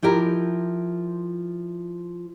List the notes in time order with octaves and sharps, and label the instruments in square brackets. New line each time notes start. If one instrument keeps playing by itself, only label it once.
[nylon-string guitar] F3 E4 G4 A#4